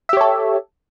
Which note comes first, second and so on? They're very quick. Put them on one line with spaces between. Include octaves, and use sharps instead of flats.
E5 G4 C#5 A4